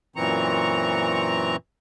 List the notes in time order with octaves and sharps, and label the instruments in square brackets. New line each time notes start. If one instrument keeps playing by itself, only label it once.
[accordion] F#2 A#2 E3 C4 A#5 C#6